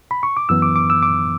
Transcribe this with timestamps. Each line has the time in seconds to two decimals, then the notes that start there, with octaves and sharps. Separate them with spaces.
0.11 B5
0.23 C#6
0.37 D6
0.49 F#2 E3 B3 E6
0.62 D6
0.76 D6
0.90 E6
1.03 D6